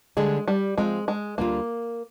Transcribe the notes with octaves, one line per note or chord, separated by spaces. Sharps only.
D3 G3 G#3 D4 G#4
G3
F3 G#3 C4 F4
G#3
D2 D3 G3 A#3 D4 F4